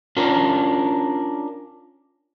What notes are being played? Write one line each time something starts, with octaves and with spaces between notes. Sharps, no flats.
C#4 D4 F4 A#4